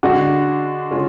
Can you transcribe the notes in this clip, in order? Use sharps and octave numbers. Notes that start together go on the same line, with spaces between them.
D3 G#3 D4 F#4
C#3 G#3 C#4 F4